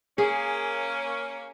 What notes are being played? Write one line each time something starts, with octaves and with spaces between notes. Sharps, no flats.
A#3 C#4 G#4